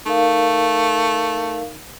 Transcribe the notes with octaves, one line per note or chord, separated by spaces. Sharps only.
A3 D#4 A#4 F5